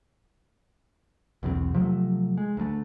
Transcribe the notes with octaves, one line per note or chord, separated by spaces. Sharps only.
B1 E2 F#3 C4
C3 F3 F#3 A3
G#3
D2 F#3 A3